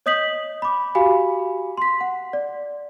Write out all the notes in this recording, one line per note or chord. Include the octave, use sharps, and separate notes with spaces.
C#5 D#5 D#6 G6 B6 F#7
B5 D6
F#4 G4 F5 G#5 B5
C6 B6
F#5
D5